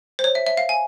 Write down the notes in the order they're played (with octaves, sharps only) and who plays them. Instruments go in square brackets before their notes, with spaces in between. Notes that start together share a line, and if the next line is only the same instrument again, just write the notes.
[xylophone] C5
C#5
E5
E5
F5
G#5